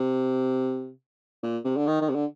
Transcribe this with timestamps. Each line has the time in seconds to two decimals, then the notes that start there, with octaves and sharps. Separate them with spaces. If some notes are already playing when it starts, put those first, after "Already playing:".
Already playing: C3
1.43 A#2
1.64 C3
1.76 D3
1.87 D#3
2.01 D#3
2.09 C3
2.15 D3